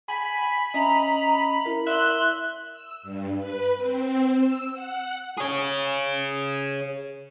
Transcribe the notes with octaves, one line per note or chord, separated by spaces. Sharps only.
G#5 B5
C#4 D#5 E5 A#5
E4 A#4
E5 C6 F#6
E6
G2
B4
C4
E6
F#5
G#4 C#5